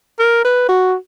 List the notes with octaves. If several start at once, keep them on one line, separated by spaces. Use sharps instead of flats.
A#4
B4
F#4